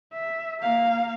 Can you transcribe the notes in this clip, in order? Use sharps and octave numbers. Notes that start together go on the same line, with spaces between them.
E5
A#3 F5